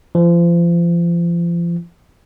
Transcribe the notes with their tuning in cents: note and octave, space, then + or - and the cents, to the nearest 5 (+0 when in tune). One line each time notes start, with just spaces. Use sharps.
F3 -35